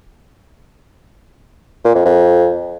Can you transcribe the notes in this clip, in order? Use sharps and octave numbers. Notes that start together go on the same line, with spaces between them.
A#2
F2
F2